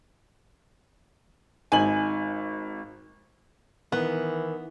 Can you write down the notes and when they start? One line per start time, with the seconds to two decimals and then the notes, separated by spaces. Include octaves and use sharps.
1.72 G#1 D#4 G#5 F#7
3.92 D#3 E3 B3